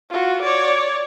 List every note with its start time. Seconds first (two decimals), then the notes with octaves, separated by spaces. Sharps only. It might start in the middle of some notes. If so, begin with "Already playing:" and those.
0.10 F4 F#4
0.42 C#5 D5